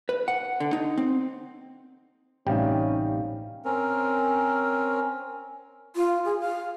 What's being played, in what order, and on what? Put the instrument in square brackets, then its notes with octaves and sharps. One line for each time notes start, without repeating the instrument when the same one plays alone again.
[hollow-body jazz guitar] B4
F#5
D3
D#4
C4
[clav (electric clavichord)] A1 C3 G3 [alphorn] C#4 [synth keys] D#4 F5 G5
[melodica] C4 C#4 A#4
[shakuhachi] F4
G#4
F5